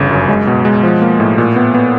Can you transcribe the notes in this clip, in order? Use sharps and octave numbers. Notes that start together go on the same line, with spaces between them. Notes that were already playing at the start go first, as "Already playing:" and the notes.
Already playing: G1 E2 C#3
F#2
G#3
B2
G#3
F3
A#3
A2
A#2
B3
B3